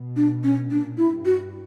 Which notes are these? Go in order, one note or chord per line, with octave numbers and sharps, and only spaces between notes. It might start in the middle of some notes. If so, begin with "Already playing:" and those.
Already playing: B2
D4
C#4
A#2 D4
E4
G2
F#4